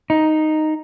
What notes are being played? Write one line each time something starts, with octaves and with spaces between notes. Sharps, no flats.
D#4